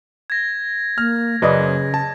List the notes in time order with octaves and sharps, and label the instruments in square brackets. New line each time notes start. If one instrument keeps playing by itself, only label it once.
[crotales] G#6 A#6
[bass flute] A#3 [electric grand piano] F6
[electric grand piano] F#2 [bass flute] C#3 [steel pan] B4 D5 D#5
[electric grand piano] A5